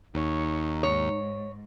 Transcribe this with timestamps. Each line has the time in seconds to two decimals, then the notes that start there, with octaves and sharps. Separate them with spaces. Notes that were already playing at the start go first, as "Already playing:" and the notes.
0.14 D#2 D#4 C#5
0.83 G#2 C#5